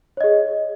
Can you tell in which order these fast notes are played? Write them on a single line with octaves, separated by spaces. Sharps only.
C#5 D#5 G#4